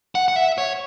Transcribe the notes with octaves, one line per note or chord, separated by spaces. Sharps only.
F#5
F#5
E5
C#5